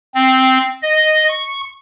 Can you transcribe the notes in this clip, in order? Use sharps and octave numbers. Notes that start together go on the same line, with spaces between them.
C4
D#5
C#6